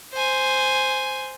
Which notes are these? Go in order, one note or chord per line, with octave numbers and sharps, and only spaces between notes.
C5 G#5